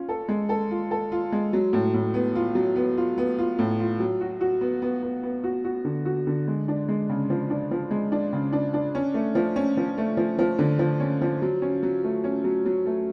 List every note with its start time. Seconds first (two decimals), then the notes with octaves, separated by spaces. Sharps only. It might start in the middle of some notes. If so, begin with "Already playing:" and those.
Already playing: C#4 F4
0.09 A4
0.29 G#3
0.49 A4
0.71 F4
0.91 A4
1.12 F4
1.32 G#3
1.53 F#3
1.73 A2
1.94 A2
2.14 B3
2.35 F4
2.55 F#3
2.76 B3
2.97 F4
3.18 B3
3.39 F4
3.59 A2
3.80 F4
4.00 F#3
4.21 F#4
4.41 F#4
4.61 B3
4.82 B3
5.02 B3
5.23 B3
5.44 F#4
5.65 F#4
5.85 D3
6.05 F#4
6.27 D3
6.48 G#3
6.68 D4
6.88 G#3
7.09 C#3
7.30 F3
7.50 D4
7.71 F3
7.91 G#3
8.12 D4
8.33 C#3
8.53 D4
8.74 D4
8.95 C#4
9.14 A3
9.35 F3
9.56 C#4
9.77 F3
9.97 A3
10.17 F3
10.39 F3
10.59 D3
10.79 F3
11.00 C#4
11.21 F3
11.42 F#3
11.62 C#4
11.83 F#3
12.04 A3
12.24 C#4
12.44 F#3
12.66 F#3
12.86 A3